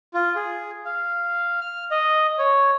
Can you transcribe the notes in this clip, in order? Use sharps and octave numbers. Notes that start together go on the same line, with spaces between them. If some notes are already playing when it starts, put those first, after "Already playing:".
F4
G#4
F5
F6
D#5
C#5